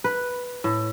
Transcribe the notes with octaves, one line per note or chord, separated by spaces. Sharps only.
B4
A2